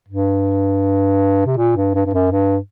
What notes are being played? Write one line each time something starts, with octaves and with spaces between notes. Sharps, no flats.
G2
C3
A#2
G2
G2
G2
F#2
G2